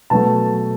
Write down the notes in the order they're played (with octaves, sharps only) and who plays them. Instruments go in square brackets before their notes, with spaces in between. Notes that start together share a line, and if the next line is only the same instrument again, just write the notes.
[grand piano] B2 F#3 A3 A5